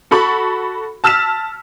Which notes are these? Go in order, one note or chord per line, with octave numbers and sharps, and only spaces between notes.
F#4 A4 B5 C#6
A5 E6 F6 B6 E7